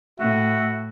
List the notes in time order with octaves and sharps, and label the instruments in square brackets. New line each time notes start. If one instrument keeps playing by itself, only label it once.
[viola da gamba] A2 [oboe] F#4 [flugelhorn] E5